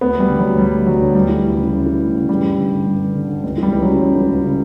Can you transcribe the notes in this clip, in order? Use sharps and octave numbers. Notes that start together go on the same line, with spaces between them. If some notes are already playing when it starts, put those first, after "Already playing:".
D2 B3
D2
G3
D3
F#3
D3
D2 G3
D2
D3 F#3
D3
D2 G3
E3
D2
C#3
D2
E3
D2
C#3
G2 G3
G2
D3
D3
G2
G2
D3
D3
C#2
E3 G3
C#2
C#3 F#3
C#2
E3
C#2
C#3